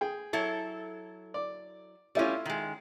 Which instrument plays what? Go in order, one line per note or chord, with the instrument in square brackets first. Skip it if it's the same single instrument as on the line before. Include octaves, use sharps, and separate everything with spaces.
[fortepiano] G#4 G5
[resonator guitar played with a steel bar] F#3 E4 A4
[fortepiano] D5
[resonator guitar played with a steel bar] G3 C#4 [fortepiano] A3 E4 F4
[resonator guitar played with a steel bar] D#3 G#3